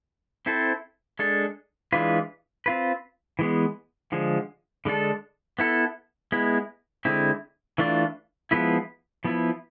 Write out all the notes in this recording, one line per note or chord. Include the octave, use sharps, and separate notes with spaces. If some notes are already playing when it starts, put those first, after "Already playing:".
C4 E4 A4 C5
G#3 D4 A4
E3 G#3 D4 F4 B4
C4 F4 B4
E3 G#3 B3
D3 F3 G#3
D3 G#3 D4 A4
B3 E4 A4
G#3 B3 E4
D3 G#3 C4 E4
E3 A3 D4 F4
F3 G#3 B3 E4 B4
F3 B3 E4